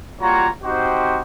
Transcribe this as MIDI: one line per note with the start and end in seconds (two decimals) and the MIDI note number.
0.21 0.48 55
0.21 0.48 58
0.21 0.48 65
0.21 0.48 66
0.21 0.48 73
0.21 0.48 82
0.64 1.21 60
0.64 1.21 63
0.64 1.21 66
0.64 1.21 67
0.64 1.21 72